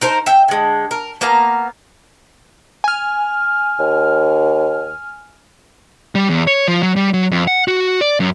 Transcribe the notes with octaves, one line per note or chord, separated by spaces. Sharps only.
D#4 A#4 C5
E5 G5
D3 G#3
A#4
A#3 B3 F5 A#5
G#5 F6
D#2
G3
E2
C#5
F3
F#3
G3
F#3
F2
F#5
F#4
D5
F#2